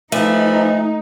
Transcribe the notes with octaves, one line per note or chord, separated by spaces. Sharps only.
E3 F3 A3 D#4